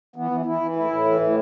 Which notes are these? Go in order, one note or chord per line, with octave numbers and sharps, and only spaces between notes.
E3 B3
E3
E3 E4
E3
A2 E4
A2
E3
A2